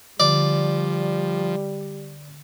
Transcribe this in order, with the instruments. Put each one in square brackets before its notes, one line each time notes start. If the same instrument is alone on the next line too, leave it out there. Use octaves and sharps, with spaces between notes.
[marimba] D3 [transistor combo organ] F3 [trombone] G3 [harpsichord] D5